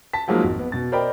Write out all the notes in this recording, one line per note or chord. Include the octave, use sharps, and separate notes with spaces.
A5 B6
F3 F#3 G#3 A#3 D#4
G#1
B3
B2 A6
A#4 C5 D5 D#5 G5 B5